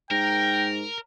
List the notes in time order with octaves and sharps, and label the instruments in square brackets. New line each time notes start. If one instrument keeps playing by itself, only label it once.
[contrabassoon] G#2 [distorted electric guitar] A#4 [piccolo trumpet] G5 [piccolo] A#6